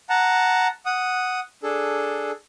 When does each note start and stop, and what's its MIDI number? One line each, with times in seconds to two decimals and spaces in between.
0.10 0.67 78
0.10 0.67 81
0.10 0.67 82
0.86 1.40 78
0.86 1.40 87
1.63 2.31 62
1.63 2.31 68
1.63 2.31 69